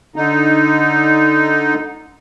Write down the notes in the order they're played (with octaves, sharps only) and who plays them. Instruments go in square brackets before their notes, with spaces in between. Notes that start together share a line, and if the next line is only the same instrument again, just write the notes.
[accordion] D3 D#4